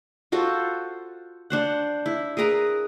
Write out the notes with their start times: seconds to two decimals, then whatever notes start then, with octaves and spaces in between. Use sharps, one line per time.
0.32 F4 F#4 A4 C5
1.50 D4 C5 F#5
2.06 E4
2.37 G#4 A#4 B4 A#5